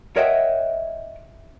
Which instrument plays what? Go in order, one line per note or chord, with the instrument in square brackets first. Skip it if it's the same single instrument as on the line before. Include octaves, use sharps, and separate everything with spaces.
[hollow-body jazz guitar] A#4 C#5 D#5 E5 F#5 G5